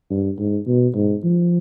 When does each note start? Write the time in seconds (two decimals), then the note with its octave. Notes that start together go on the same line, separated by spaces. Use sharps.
0.10 G2
0.39 G#2
0.67 B2
0.95 G#2
1.24 F3